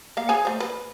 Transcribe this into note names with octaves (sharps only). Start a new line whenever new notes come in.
A#3 F5
G#4 C#5 G#5
A3 C5
B4